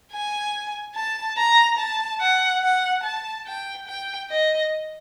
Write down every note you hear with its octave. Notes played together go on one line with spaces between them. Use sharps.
G#5
A5
A#5
A5
F#5
F#5
A5
G5
G5
D#5